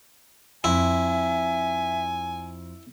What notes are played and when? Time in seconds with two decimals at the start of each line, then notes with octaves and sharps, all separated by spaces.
0.64 F2 E4 E5 G#5